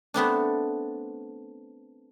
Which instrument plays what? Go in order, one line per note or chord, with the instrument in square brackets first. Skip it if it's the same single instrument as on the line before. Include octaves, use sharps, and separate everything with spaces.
[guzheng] A3 B3 C4 D4